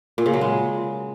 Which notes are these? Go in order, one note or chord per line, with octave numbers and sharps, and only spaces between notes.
A#2
C#3
F#3
G#3